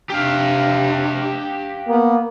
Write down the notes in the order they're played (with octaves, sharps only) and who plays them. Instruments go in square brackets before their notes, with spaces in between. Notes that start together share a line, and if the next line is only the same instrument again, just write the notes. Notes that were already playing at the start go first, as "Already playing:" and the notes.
[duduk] C3 [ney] D4 [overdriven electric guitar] G4 F5
[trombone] A#3 [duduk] B3